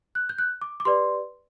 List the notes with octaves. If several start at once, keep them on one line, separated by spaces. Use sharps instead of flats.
F#6
G6
F#6
D6
D6
G4 B4 D5 C6